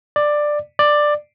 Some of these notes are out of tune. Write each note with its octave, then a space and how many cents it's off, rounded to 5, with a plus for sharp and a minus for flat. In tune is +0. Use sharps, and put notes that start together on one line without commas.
D5 +10
D5 +10